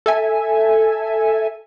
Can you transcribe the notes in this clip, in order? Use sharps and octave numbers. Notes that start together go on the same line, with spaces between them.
A4 E5 G#5